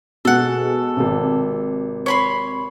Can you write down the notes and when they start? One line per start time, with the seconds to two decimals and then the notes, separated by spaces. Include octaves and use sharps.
0.25 B2 G#3 G#4 A4 F#5
0.97 G#1 C3
2.06 C#5 B5 C6